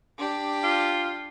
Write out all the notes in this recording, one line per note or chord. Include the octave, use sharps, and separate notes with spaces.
D4 G4
F4